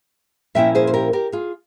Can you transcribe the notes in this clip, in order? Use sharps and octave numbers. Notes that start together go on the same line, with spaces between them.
A#2 F3 A#3 C#4 E4 E5 G5
G#4 C5
C5
G4 A#4
G4 A#4
F4 G#4